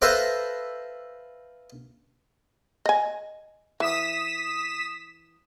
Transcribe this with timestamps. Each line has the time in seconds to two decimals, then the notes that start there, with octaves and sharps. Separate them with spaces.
0.02 A4 B4 C5 E5 F5 A#5
2.86 D#5 G#5
3.80 E3 D#6 B6 E7